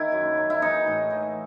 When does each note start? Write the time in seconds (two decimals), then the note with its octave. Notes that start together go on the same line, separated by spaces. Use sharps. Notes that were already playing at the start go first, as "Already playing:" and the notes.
Already playing: D#3 E4
0.12 F#2
0.37 F#3
0.50 E4
0.62 E3 D#4
0.87 A2
1.10 E3